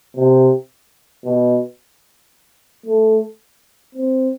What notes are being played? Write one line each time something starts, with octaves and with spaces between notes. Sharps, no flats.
C3
B2
A3
C4